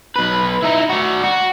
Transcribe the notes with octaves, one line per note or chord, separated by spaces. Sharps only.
B1 B4
D#4 E4
F#4 D5
F#4